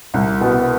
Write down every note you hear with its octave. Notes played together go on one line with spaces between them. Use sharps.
C2
B2 B3